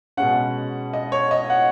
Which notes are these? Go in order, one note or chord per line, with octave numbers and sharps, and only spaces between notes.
B2 G#3 C#4 F#5
D#5
C#5
D#5
F#5